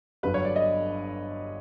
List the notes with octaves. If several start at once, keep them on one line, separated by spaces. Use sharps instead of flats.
G1 G2 D3 F#3 B4
C#5
D5
D#5